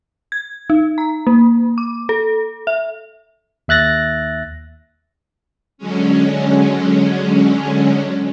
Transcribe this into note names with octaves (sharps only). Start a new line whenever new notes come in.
G#6
D#4
A#5
A#3
D6
A4
E5
D#2 E5 F#6 A6 A#6
D3 F#3 G#3 C#4